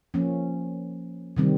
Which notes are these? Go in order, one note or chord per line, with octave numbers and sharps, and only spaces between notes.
F3 A#3 C#4
C3 D#3 G3 C4